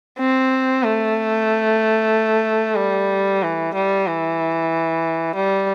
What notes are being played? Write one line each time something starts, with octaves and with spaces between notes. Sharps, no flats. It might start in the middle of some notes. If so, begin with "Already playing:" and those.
C4
A3
G3
E3
G3
E3
G3